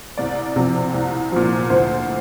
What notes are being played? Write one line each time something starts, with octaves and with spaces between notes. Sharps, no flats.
C2 D5
C3 F3
C2
A#2 F3
D2 C5